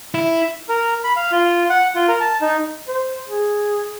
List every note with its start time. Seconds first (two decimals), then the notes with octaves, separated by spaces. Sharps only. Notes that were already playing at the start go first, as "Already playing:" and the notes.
0.14 E4
0.69 A#4
1.04 B5
1.16 F5
1.32 F4
1.70 F#5
1.95 F4
2.09 A#4
2.20 A5
2.41 D#4
2.88 C5
3.26 G#4